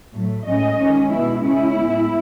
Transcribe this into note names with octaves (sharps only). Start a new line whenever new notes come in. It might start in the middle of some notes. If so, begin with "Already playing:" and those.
A2 F#3 A3
A2 G#3 C#4 D#5
D#3 G#3 C#4
B2 G#3 B3 E4
C#3 G#3 C#4 E4
A2 G#3 B3